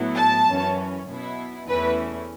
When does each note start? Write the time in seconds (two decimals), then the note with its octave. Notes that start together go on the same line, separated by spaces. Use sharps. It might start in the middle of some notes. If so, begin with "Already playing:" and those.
Already playing: A2 F#3 B3 E4
0.17 A5
0.46 F#2 E3 C#4
1.08 B2 B3 E4
1.68 E2 E3 A3 C#4 E4 B4